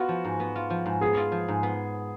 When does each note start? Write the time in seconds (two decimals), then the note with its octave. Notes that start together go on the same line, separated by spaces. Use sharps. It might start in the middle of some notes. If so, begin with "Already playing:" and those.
Already playing: B3 F4 F#4
0.09 F3
0.25 G#2
0.40 B3
0.56 F4
0.70 F3
0.86 G#2
1.01 B3 G#4
1.17 F4
1.32 F3
1.48 G#2
1.63 B3